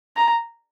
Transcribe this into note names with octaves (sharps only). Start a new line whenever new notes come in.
A#5